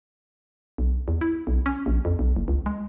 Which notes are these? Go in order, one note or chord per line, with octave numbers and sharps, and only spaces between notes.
B1
E2
E4
B1
C#4
A#1
F2
B1
F#1
C#2
G#3